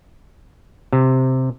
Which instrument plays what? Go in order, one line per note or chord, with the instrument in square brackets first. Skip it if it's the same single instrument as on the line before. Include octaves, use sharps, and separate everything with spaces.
[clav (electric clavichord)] C3